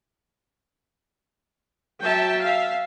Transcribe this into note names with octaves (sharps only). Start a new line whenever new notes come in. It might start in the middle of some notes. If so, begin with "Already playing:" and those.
F#3 E5 G5 A5
E5 F5